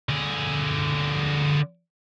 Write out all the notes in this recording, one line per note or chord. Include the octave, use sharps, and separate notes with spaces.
D3 G#4